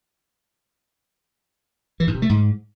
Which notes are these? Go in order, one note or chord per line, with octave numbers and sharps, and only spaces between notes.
E3
G#2
C3
A3
G#2